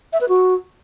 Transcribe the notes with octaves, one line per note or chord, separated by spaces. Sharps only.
E5
B4
F#4